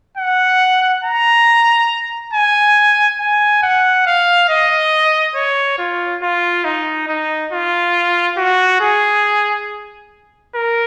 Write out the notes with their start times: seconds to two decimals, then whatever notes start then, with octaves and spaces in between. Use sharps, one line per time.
0.17 F#5
1.04 A#5
2.33 G#5
3.20 G#5
3.63 F#5
4.06 F5
4.49 D#5
5.35 C#5
5.78 F4
6.22 F4
6.64 D#4
7.08 D#4
7.52 F4
8.37 F#4
8.81 G#4
10.55 A#4